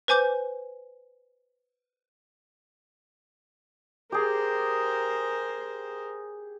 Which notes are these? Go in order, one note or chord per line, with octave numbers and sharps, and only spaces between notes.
B4 C5 G#5 D6 G6
G4 G#4 A#4 C5